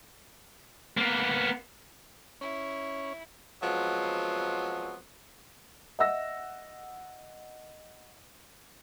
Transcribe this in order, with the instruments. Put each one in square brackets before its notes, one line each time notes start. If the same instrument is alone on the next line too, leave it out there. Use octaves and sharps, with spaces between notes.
[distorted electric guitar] A#3 B3
[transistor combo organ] C#4 C#5 [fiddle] E4
[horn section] F3 F#3 G#3 B3 C4
[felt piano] D#5 E5 F#5 E6 A#6